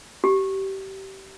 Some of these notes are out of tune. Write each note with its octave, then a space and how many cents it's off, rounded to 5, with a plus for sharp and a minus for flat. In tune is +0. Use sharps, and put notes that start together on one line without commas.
G4 -25